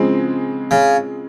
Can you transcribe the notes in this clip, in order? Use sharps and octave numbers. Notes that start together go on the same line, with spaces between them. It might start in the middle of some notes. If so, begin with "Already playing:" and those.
Already playing: C#3 F3 G#3 C4
C#3